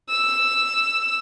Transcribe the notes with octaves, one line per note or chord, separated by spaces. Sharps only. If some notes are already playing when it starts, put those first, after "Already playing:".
E6